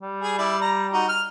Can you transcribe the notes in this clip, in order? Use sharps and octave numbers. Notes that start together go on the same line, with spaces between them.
G3
G#4
E4 D5
A#5
D#4 F#4
F6